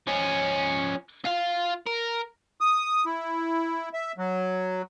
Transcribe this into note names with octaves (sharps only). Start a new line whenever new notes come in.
F3 C#4
F4 F5
A#4
D#6
E4
E5
F#3